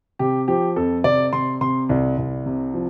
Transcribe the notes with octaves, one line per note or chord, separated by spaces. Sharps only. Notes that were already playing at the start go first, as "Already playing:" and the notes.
C3 G4
F3 G4
F2 A4
C3 D5
C3 C6
C3 C6
C2
C2
C3
F3